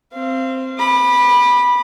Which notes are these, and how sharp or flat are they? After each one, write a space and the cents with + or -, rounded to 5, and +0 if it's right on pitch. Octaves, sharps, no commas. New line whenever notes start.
C4 +0 F5 -30
B5 -10 D6 +35